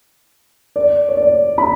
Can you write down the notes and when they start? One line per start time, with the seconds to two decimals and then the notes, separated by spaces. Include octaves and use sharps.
0.76 D5
1.09 C#5
1.17 D5
1.58 B5